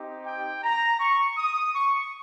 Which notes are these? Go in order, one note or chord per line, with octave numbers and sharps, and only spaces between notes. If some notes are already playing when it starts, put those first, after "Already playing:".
Already playing: C4 D#4 G4
G5
A#5
C#6
D#6
C#6